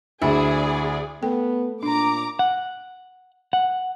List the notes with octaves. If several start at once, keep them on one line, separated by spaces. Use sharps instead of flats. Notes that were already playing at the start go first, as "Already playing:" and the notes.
D2 E4 G#4 D5
A3 B3 G5
A#2 D4 A#5 D6
F#5
F#5